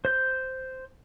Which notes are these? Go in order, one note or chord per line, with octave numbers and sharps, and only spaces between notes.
C5 G6